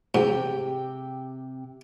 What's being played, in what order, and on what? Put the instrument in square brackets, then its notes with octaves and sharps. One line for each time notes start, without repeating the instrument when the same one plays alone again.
[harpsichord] G#2 [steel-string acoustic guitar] C3 G4 G5